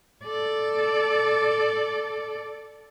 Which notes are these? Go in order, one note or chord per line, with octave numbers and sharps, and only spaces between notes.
A4 D5